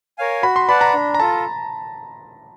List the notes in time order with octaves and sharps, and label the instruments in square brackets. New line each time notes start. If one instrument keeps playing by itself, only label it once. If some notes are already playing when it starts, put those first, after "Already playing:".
[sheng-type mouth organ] A#4 C#5 F5 G#5
[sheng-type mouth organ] F#4 [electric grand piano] B5
[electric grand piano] C6
[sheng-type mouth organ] B4 D5 F#5 A5 [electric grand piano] B5
[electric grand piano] A#5
[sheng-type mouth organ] D4
[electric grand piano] A#5
[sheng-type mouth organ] F4 A4 [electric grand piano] A5